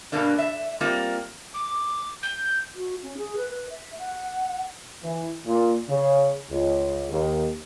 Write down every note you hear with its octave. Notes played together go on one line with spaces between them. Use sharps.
G2 B2 A#3 D4
E5
G3 A#3 C4 F4
D6
G6
F#4
C#4
G#4
B4
B4
E5
F#5
E3
A#2
C#3
C#2
D#2